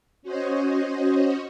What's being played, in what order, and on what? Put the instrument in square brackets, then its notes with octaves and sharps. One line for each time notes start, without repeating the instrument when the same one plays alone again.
[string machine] C#4 F#4 C5 C#5 D#5